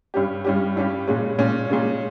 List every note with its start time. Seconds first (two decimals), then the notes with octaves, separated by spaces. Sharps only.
0.14 G2 G3 C#4 G4
0.45 G2 G3 C#4 G4
0.76 G2 G3 C#4 G4
1.07 A#2 G#3 C#4
1.38 A#2 G#3 C#4
1.70 A#2 G#3 C#4